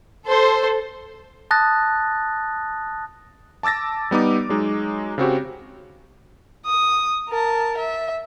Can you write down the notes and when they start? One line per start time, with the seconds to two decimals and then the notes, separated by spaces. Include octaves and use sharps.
0.25 A4 C5
1.51 A5 D#6 F#6 A6 A#6
3.63 A5 D6 E6 A6 A#6
4.11 G3 B3 D#4 D6
4.49 F#3 G#3 D#4
5.18 C#3 C4 F#4 G4
6.66 D#6
7.29 A#4 A5
7.78 E5